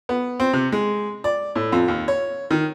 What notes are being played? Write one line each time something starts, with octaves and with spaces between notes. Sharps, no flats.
B3
C4
C3
G#3
D5
A2
F2
D#2
C#5
D#3